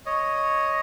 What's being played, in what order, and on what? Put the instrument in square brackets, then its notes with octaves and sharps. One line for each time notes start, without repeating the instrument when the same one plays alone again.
[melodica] C#5 D#5